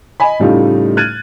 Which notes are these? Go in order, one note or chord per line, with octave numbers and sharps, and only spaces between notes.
D#5 G#5 B5
A2 C#3 G3 A3 D#4 F4
F6 F#6 G#6 A6 D#7